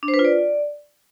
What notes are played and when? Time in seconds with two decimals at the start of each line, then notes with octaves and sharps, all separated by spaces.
0.03 D4
0.08 C5
0.14 B4
0.19 F4
0.25 D5